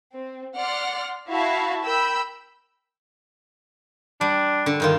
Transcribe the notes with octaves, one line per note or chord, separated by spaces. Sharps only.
C4
D5 F#5 C6 F6
E4 F#4 E5 F5 A5 B5
A#4 G5 B5 E6 G6
G3 D4
D3
G2 D#3 F4